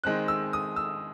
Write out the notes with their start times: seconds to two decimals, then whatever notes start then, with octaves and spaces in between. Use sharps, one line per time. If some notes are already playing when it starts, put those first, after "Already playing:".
0.04 D#3 G#3 C4 F#6
0.28 E6
0.53 D#6
0.76 E6